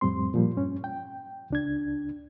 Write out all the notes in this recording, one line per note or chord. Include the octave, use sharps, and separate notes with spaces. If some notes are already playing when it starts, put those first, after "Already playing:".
F2 A2 G3 C4 C6
A#2 F3 G3
G2 C#4
G5
C#2 D4 G#6